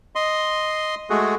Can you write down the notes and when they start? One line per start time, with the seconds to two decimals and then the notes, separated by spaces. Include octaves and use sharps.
0.15 D#5 C6
1.10 G#3 A3 F#4 G#4